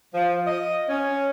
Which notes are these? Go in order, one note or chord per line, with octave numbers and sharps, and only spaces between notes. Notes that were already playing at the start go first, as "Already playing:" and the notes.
F3
D#5
C#4